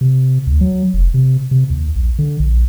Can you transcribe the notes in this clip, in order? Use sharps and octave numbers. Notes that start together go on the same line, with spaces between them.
C3
D2
F#3
F1
C3
C3
D#2
A#1
D3
A#1